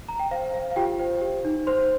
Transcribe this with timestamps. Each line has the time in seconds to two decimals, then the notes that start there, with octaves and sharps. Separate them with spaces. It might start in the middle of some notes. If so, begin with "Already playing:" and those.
0.09 A#5
0.19 G5
0.31 C5 F5
0.53 C5 F5
0.71 F5
0.76 F4 G4 G5
0.99 C5
1.21 G4
1.45 D#4
1.67 C5 C6